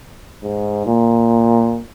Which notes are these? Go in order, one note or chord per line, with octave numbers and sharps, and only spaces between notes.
G#2
A#2